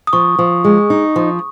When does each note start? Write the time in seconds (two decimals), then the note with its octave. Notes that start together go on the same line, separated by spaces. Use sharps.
0.07 D#6
0.13 F3 C#6
0.39 F3
0.64 G#3
0.90 D#4
1.16 F3